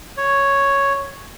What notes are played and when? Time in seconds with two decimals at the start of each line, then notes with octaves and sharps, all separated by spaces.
0.17 C#5